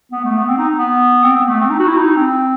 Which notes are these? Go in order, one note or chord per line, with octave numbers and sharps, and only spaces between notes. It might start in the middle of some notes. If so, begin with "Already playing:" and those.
B3
A3
B3
C4
D#4
B3
C4
B3
A3
C4
D#4
F#4
E4
D#4
C4